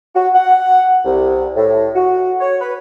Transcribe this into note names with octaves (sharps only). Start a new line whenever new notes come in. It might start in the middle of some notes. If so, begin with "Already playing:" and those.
F#4
F#5
C2
A2
F#4
C#5
B4